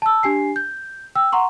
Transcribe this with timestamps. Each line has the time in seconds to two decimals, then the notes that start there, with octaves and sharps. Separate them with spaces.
0.02 A5 E6
0.23 D4 G4 G#5 C7
0.56 G6
1.15 G5 E6
1.32 F#5 A#5 C6 C#6